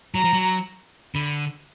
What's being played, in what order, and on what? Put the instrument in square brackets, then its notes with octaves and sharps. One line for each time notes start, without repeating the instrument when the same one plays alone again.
[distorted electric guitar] F#3 [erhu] A#5
[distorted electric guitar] F3
F#3
[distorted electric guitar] D3 [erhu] B5